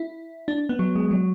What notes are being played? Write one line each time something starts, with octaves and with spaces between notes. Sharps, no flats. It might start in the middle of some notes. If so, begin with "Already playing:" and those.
Already playing: E4
D4
B3
F#3
G#3
F#3